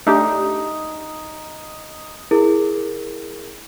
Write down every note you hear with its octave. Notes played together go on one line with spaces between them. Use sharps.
A3 D4 D#4 G4
E4 G#4 A#4